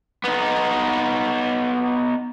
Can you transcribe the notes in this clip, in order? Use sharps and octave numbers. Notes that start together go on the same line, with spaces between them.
B3 D#4